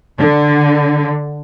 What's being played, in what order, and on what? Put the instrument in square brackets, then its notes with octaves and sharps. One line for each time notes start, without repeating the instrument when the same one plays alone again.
[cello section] D3